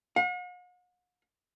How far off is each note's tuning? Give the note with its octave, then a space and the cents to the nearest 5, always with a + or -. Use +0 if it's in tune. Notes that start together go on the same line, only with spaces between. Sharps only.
F#5 -45